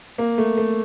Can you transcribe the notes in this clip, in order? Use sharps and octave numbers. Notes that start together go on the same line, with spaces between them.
A#3
A3
A3